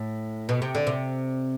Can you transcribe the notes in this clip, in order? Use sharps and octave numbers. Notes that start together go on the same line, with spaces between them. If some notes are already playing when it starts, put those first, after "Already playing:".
Already playing: A2
B2
C3
D3
C3